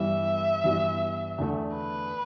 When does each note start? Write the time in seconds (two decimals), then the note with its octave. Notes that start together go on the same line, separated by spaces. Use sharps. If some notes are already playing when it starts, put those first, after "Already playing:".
Already playing: G2 E3 G3 B3 E4 E5
0.64 G2 E3 G3 B3 E4
1.38 E2 D3 A3
1.75 B4